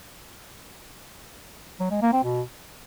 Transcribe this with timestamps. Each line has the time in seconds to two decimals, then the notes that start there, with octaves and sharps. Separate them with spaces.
1.80 F#3
1.91 G#3
2.02 A#3
2.13 C4
2.24 B2